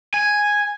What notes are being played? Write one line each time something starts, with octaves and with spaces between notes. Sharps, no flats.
G#5